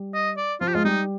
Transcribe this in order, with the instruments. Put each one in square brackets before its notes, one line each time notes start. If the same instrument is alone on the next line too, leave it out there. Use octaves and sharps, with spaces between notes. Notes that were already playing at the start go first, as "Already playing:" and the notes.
Already playing: [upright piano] G3
[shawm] D#5
D5
[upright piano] F3 [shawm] F4
[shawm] G4
[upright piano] G#3 [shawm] F4
[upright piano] G3 [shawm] D#4